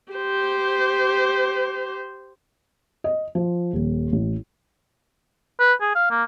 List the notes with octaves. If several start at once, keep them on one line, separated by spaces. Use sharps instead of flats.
G4 C5
D#5
F3
D#1
A1
B4
G#4
F5
A#3